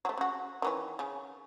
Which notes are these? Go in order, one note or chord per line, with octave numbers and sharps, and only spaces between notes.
F#3 A3
C#3 F#4
D#3 E3 C#4
C#3